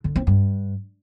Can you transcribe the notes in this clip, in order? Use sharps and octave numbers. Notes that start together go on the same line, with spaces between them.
D3
C4
G2